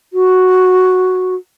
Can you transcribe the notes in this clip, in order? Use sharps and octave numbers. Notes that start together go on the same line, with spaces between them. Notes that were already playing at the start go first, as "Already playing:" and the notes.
F#4